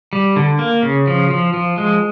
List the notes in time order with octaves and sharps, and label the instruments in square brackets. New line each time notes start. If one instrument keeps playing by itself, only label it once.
[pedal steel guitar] G3
D3
A#3
C#3
F3
F3
F3
G#3